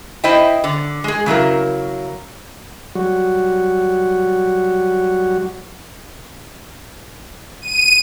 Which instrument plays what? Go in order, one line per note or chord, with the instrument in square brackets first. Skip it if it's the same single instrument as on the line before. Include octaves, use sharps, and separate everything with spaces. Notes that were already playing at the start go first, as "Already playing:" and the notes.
[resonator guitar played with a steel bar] E4 C5 D#5 E5 G5
D3
G#3 G#4
C#3 F#3 E4 A#4
[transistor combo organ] F#3 G3 F#4
[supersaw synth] D#7